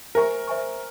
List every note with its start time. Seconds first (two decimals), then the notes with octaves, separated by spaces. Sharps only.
0.15 A#4 C5 E5 G#5 C#6
0.47 C5 E5 G#5 C#6